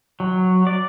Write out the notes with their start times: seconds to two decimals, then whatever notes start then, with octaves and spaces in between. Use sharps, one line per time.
0.20 F#3
0.67 D5